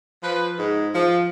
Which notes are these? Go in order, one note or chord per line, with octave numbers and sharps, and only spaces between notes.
F3 B4
G#2
F3